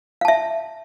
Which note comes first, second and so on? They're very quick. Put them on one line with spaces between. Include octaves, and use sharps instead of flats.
F5 A5 E5